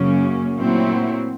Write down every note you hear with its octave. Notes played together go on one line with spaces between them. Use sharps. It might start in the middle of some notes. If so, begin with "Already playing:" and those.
Already playing: F#2 C#3 F#3 A#3 C#4
A#2 F#3 A3 C4 E4